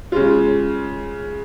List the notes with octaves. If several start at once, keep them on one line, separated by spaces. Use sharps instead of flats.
C#3 G#3 F4